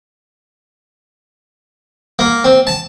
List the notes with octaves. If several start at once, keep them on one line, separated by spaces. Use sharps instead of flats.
A#3
C4
A5